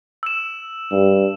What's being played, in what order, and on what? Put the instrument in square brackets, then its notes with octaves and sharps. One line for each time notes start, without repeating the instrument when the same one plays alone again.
[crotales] E6 E7
[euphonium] G2